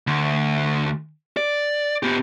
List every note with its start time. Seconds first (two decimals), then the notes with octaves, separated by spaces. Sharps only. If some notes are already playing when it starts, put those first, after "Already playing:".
0.07 D2
1.37 D5
2.03 B3 G4